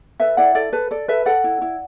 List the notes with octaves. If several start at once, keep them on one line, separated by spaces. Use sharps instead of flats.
A4 B4 E5
E4 D5 F#5
A4 D5
A4 B4
A4 D5
A4 B4 E5
A4 D5 F#5
E4
E4